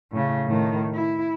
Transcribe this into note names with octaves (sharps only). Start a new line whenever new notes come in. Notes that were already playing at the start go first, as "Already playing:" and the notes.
A2 C#3
A2 D#3
E4